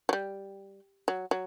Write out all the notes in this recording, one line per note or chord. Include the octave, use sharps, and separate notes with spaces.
F#3
G3
F#3
F#3